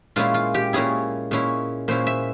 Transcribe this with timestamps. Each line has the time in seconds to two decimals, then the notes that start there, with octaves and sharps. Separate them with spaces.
0.16 A#2 G#3 C#4 E4 F4
0.34 F4
0.54 G4
0.73 A#2 G#3 C#4 E4 G#4
1.31 A#2 G#3 C#4 E4
1.88 A#2 G#3 C#4 E4 C5
2.07 E5